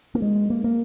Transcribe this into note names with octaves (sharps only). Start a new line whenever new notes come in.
A#3
G#3
A#3
A#3